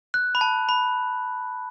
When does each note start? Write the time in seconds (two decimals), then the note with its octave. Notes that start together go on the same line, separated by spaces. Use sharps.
0.14 F#6
0.35 B5
0.41 A5
0.69 B5